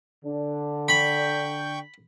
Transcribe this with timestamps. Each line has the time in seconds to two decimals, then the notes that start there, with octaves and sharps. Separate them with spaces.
0.24 D3 D4
0.88 G5 B5 C#6 G6